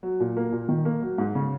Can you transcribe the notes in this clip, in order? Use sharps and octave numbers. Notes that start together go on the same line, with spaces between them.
F#3
A#2
A#3
A#2
D#3
A#3
F#3
G#2
C#3